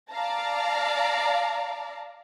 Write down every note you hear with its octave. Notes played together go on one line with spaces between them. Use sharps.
D5 F5 A5 A#5